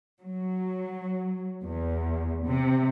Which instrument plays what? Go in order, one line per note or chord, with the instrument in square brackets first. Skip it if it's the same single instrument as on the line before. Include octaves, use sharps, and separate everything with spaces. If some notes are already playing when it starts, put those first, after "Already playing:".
[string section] F#3
E2
C3